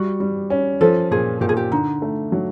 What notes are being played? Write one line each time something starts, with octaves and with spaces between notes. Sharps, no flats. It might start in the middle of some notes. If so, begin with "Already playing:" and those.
Already playing: G3 F#4
G3
C#4
F3 A4
A#2 G#4
A#2 G4
G#4
G4
D3 D#4
A3
F#3